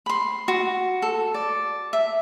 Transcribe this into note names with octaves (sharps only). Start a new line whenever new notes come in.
B5 C6
F#4
A4
D5
E5